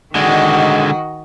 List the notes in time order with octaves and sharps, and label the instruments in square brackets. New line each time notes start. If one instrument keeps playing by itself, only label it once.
[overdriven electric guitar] D3 G#3 [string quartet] D#3 F#4 D#5